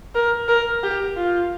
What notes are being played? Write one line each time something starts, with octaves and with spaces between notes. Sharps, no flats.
A#4
A#4
G4
F4